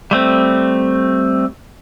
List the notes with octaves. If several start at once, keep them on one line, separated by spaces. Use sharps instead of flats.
G3 A3 C4